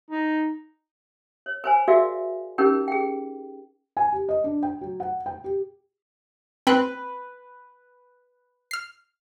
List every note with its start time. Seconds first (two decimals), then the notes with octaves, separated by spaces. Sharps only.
0.10 D#4
1.46 C#5
1.64 B4 C5 G#5
1.88 F#4 G#4 A#4 D5 E5 F5
2.58 C#4 D#4 G4 A#4 B4
2.88 G#4 G5
3.97 G#5
4.12 G4
4.29 D#5
4.44 D4
4.63 G5
4.81 F#3
5.00 F#5
5.26 G5
5.44 G4
6.67 C4 B4 G5 B5 F#6
8.71 F6 C7